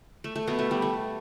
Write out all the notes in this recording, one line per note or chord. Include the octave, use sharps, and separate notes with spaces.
A3
A3
B2 B3
A3
G3
A3